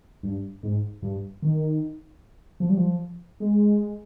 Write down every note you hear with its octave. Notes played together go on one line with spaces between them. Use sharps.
G2
G#2
G2
D#3
F3
G3
F3
G#3